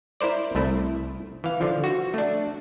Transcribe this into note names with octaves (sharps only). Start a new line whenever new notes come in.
E4 A#4 C5 D5
C2 A3 E4
E3 F5
D3 F3
F#4
A3 D4